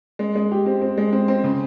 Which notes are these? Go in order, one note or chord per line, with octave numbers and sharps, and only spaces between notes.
G#3
G#3
G4
C4
C4
G#3
C4
C4
C#3